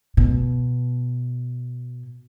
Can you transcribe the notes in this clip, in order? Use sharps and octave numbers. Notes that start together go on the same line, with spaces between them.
B2